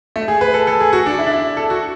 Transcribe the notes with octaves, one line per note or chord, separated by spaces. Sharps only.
A3
G#4
B4
A4
A4
G#4
F#4
D4
E4
D4
E4
A4
F#4